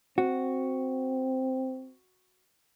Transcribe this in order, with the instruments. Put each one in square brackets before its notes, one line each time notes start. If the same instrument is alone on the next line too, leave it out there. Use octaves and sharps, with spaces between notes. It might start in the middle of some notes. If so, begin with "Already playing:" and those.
[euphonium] C4 [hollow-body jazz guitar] F#4